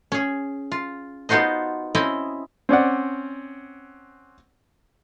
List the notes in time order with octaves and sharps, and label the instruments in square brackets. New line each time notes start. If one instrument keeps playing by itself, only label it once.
[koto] C#4 G#4
F4
B3 D#4 F4 F#4 C5 D#5
C4 C#4 E4 D#5
[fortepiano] C4 C#4 D5 F#5